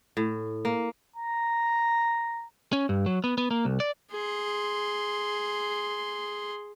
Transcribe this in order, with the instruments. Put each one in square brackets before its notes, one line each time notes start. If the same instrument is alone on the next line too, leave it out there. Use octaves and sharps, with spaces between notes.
[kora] A2
A#3
[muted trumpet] A#5
[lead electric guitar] C#4
G2
F#3
B3
B3
A#3
C2
D5
[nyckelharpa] G#4 C6